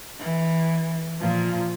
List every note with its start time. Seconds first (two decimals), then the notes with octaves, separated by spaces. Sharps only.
0.19 E3
1.19 A#2 F3